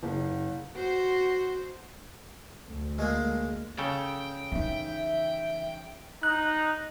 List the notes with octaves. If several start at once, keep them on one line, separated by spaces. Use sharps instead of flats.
F#1
F#4 C5
D2 A3
G#3 A#3
C#3 A4 G5
E3 D#4 E5
D#4 F#6